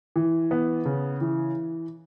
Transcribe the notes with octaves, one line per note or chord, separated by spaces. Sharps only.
E3
B3
C#3
E3